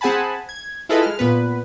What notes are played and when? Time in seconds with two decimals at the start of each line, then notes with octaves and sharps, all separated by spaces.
0.01 C4 G#4 F#5 G#5 A5 B5
0.49 G#6
0.89 E4 F4 G#4 A4 B4 D#5
1.02 G#3 F6
1.19 A#2 B3 B4